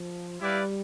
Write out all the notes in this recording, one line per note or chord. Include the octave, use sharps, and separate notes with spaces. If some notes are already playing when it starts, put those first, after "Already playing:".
Already playing: F3
G3 E4 G4 B4 D5 F5